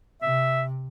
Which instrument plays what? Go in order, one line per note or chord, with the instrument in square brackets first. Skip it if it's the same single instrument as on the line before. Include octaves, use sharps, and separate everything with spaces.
[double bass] C3 [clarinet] E5